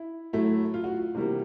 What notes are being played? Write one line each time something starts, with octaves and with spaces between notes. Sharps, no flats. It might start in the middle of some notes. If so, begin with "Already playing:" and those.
Already playing: E4
A2 F#3 A3 E4
F4
F#4
F4
C3 E3 G3 A#3 F#4